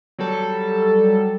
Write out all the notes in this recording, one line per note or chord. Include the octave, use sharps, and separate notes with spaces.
F#3 G3 A4